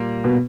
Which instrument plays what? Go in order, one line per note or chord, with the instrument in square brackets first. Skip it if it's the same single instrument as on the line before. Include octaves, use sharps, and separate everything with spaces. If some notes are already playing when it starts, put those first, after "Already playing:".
Already playing: [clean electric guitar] A#2 G3 A#3
[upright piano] B2